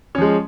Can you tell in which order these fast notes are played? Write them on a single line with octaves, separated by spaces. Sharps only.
C#4 F3 G#3